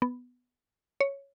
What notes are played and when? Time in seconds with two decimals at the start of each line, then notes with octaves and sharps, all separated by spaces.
0.02 B3
1.01 C#5